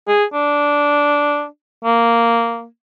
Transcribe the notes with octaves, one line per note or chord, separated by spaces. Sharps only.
G#4
D4
A#3